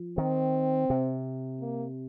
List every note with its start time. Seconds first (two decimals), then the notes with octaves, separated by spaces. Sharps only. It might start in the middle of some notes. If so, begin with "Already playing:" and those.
Already playing: F3
0.18 D#3 C4
0.90 C3
1.61 A#3